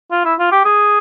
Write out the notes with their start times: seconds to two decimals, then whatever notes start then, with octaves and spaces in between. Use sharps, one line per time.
0.11 F4
0.25 E4
0.39 F4
0.52 G4
0.65 G#4